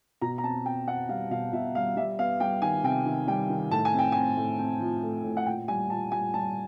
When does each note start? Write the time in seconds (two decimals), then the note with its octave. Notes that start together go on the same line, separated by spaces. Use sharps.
0.22 B2 A#5
0.38 A#5
0.44 C4 A5
0.65 C4 G5
0.87 C4 F#5
1.09 G3 F5
1.31 B2 F5
1.53 B2 E5
1.75 G3 F5
1.96 G3 E5
2.19 B3 F5
2.40 G3 G5
2.62 D#3 G#5
2.84 C3 G5
3.06 D#3
3.27 G3 G5
3.50 D#3
3.71 A2 A5
3.85 G#5
3.94 C4 G5
4.12 C4 G#5
4.37 A2
4.59 C4
4.80 F3
5.03 A3
5.24 A2
5.37 F#5
5.46 A#2 G5
5.68 G3 G#5
5.90 A#2 A5
6.12 G3 G#5
6.34 G3 A5